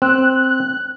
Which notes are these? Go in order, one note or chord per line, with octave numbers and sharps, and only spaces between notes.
C4 F#6